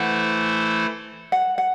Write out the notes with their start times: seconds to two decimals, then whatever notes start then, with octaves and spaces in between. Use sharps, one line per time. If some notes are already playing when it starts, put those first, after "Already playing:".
Already playing: E3 A3 E4 A4 C5 F#5
1.32 F#5
1.58 F#5